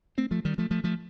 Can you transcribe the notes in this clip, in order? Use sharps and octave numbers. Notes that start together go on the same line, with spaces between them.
A3 C4
F3 A3
D#3 G3
F3 A3
F3 A3
F3 A3